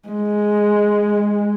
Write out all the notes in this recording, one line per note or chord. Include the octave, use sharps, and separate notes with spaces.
G#3